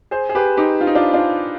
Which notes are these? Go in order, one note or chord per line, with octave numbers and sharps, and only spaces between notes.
G#4 C5
G#4
G4 B4
D#4 G4
F4
D#4
D4 F4
D4 F4